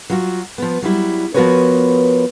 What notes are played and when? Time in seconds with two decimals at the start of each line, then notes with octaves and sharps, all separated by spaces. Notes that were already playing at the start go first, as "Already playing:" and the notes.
0.10 F#3 F4 F#4
0.58 F3 B3
0.82 F#3 G3 E4
1.34 F3 B3 F#4 A#4 B4 C#5